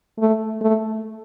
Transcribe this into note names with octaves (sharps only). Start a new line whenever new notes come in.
A3
A3